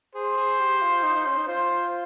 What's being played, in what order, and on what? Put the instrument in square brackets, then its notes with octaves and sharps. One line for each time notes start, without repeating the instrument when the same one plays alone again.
[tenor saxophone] G#4 [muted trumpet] C5
[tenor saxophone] G#4
G4
F4
D#4
D#4
C#4
D#4
[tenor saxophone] F4 [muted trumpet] C5